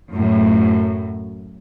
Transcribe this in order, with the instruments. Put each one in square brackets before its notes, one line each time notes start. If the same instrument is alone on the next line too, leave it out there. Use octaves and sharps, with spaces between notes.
[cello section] F#2 A2